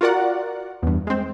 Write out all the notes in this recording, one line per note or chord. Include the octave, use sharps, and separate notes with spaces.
F4 F#4 A#4 D5 F#5
E2 G2
G#3 C4